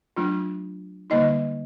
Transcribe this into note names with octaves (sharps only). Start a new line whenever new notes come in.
F#3 A3 D4 F4
D3 G3 A#3 D#4 D#5